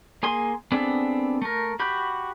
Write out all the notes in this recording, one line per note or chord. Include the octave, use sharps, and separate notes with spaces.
A#3 G#4 G#5 C6
B3 C4 D4 G#4 A4
A3 A#4
F#4 G4 B5 G6